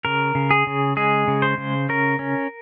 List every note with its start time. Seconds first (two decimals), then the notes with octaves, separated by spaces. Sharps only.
0.05 C#3 A#4
0.35 C#3
0.51 G#4
0.67 C#3
0.97 G#3 G#4
1.28 C#3
1.42 C5
1.58 C#3
1.89 C#4 A#4
2.19 C#4